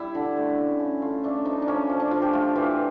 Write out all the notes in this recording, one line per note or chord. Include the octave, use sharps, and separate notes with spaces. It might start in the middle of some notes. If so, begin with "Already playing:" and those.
Already playing: G3 E4
D3
A3
C#3
C#3
A3 F4
A3 D4
F3 D#4
D4
F3 C#4
F3
D4
F3 F4
G4
A3 F4
E3 F4